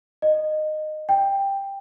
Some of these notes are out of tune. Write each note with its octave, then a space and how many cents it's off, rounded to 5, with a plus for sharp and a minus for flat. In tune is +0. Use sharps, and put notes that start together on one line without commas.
D#5 -15
G5 +10